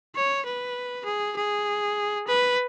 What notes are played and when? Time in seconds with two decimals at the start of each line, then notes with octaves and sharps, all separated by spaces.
0.16 C#5
0.46 B4
1.06 G#4
1.37 G#4
2.28 B4